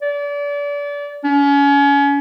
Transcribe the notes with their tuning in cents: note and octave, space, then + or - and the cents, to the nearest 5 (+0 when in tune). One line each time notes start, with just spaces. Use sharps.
D5 -30
C#4 +30